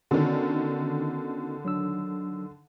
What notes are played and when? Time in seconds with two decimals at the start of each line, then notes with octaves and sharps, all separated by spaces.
0.11 D3 D#3 B3 C#4 F#4
1.65 F#3 D4 E6